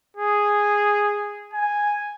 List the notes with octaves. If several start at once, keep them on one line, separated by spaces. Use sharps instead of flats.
G#4
G#5